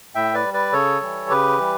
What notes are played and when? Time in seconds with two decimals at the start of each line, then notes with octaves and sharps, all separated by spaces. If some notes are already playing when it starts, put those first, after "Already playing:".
0.15 A2 E5 G5
0.34 B4 D5
0.44 G3
0.54 B4 D5
0.72 C#3 A4 C#5
1.01 E3 G3
1.29 C#3 G4 B4
1.58 E3 G3